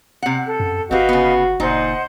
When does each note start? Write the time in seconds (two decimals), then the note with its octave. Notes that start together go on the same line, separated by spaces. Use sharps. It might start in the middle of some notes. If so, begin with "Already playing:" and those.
0.22 C3 F#5
0.45 A4
0.60 F#2
0.91 G1 C4 F#4 G4 B4 D#5 F5
1.09 C#3 B3
1.60 F#1 A#2 D#4 C5 D#5 F#5